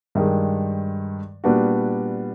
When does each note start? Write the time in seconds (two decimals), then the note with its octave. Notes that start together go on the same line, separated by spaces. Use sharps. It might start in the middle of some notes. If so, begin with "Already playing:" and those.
0.15 G2 D#3 G#3
1.44 A#2 G3 B3 D4 F#4